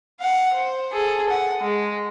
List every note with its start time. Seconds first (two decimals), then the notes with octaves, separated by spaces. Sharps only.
0.20 F5 F#5
0.53 C5
0.92 G#4 A4
1.29 F#5
1.61 G#3